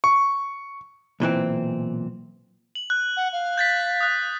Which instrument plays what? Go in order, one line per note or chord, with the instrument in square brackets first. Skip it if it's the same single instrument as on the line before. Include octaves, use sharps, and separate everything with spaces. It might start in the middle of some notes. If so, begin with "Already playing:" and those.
[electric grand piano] C#6
[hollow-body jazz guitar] B1 A#2 E3 C4
[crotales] F#7
F#6
[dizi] F#5
F5
[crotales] G6 A6 B6
D#6 F#6